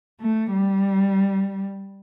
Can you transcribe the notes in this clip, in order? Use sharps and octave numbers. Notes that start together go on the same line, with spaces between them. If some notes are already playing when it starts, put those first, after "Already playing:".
A3
G3